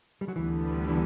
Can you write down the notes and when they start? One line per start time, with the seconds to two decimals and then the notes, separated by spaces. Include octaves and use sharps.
0.21 G3
0.28 F#3
0.35 D2 D3 E3 G3 B3
0.89 E3